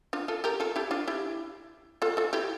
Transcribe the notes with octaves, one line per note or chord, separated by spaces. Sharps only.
D4 F4
F4 A4
G4 A#4
F4 A4
E4 G4
D4 F4
E4 G4
F4 A4
F4 A4
E4 G4